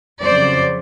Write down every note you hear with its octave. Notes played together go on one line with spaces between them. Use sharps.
F2 C#3 F#3 C5 D5